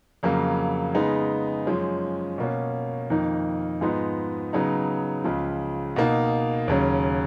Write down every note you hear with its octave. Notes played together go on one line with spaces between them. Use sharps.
F2 C#3 F#3 A#3
C#3 G#3 B3 D#4
F#2 F3 G#3 C#4
B2 A#3 C#4
F2 D#3 A#3 D#4
G#2 F3 G#3 B3 D#4
C#3 F#3 B3 D#4
C#2 C#3 F3
B2 A#3 D#4
D#2 C#3 F#3 C#4